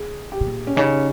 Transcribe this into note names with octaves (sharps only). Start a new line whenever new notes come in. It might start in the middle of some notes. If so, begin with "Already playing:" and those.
Already playing: G#4
G4
B2
A#2
C#4
C#3 D#4